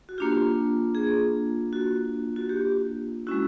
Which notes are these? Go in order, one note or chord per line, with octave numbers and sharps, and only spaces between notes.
F#4
A#3 D4 F4 G4
G#4
F#4
F#4
G4
G#3 C#4 E4 F#4